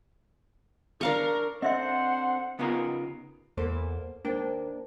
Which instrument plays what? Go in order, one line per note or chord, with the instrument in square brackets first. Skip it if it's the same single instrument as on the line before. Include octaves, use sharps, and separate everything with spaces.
[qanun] D4 F5 C#6 [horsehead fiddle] A#4
[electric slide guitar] C4 D4 A4 [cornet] C5 [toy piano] D#5 E5 C6 [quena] F#5
[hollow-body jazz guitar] C#3 B3 D#4 F4 G4 A#4
[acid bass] E2 [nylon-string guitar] A#3 A4 C5
[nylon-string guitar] D#2 A#3 G5 [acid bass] D4 [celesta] A#4 C5